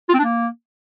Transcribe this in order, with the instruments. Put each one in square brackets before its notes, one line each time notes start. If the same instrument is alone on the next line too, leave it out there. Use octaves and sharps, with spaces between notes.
[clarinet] F4
C4
D4
A#3